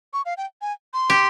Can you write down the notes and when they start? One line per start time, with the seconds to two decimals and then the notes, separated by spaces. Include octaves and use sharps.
0.13 C#6
0.26 F5
0.37 G5
0.62 G#5
0.94 C6
1.10 G4